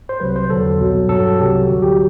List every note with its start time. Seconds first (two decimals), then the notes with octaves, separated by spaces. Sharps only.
0.09 C5
0.20 C2 C3 F#3 B4
0.36 C5
0.50 E2 D3 F#3 A4
0.79 C2 B2 F#3
1.09 G2 F#3 A4
1.38 C2 C3 F#3 G4
1.67 D2 D3 F#3 F#4
1.82 G4